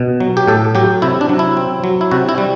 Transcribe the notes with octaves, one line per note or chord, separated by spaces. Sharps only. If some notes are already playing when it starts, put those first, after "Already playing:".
Already playing: B2
F#3
G4
A2 A4
F#3 G4
C3 E4
D4
F#3
E4
C4
F#3
E4
C3 F#4
E4
G3